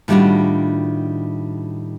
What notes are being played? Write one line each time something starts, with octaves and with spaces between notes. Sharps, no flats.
A2 D#3 G3 D4 F4 F#4